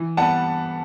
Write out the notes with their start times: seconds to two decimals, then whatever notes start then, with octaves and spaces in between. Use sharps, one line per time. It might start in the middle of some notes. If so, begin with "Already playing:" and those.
Already playing: E3
0.17 G3 B3 F#5 A5